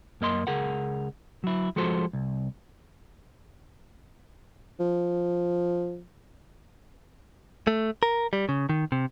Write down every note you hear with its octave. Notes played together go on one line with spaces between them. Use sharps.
F#2 A#3 D#5 C6
C#2 G#4 A#4 F#5
F#3 E4
F3 G#3 F#4 A4 C5
C2
F3
A3
A#4
G3
C#3
D#3
C3